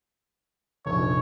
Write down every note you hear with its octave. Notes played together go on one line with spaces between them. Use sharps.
F1 A#1 C#5